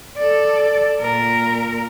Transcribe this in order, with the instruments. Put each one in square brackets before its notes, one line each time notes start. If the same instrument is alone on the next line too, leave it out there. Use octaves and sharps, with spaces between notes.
[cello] A4 D5
A#2 A#4